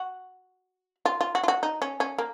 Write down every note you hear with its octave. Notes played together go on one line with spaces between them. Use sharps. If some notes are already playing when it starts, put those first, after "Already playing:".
Already playing: F#4
F4
F4
F#4
F4
F#4
D#4
C#4
C#4
A#3